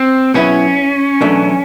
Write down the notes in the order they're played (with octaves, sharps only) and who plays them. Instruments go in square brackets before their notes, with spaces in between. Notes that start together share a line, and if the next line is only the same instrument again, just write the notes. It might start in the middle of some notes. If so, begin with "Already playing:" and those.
Already playing: [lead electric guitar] C4
[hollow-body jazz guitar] B2 F#3 B3 E4 G#4 [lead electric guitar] C#4
[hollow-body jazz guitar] E2 B2 F#3 A3 D4